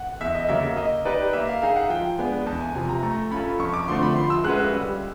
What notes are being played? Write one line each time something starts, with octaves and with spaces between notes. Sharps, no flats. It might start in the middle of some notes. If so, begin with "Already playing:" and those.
Already playing: F#5
E2 E5
D#5
C#3 F#3 A#3 E5
A#3 D#5
D#4 G4 B4 D5
A#3 E5
F5
D#4 G#4 F5
F#5
F3 G5
G#3 B3 D4 G#5
E2 A5
G#5
C3 F3 G#5
A#5
A3 A#5
C#4 F4 A4 B5
F2 C#6
D6
D3 F3 A3 C4 C6
B5
F3 C6
E6
G#3 C#4 F#4 B4 F#6
E6
G3